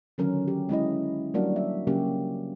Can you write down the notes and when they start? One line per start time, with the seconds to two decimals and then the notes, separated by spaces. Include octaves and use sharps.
0.18 D3 D#3 F#3 C#4 A#4
0.48 G4
0.69 G#3 C#4 E4 D#5
1.34 F#3 G3 A#3 D4 F#4 A#4
1.56 E5
1.87 C#3 F#3 A#3 C#4 G4